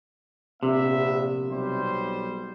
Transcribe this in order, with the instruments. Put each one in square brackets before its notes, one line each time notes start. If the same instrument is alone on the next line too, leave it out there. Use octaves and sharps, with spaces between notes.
[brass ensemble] A#1 B3 E5 [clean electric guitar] C3
[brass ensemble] B1 G3 C5